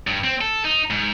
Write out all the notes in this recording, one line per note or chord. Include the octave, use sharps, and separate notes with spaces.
G2
C4
A4
D#4
G#2